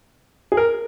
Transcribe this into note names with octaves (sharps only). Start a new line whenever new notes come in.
G#4
A#4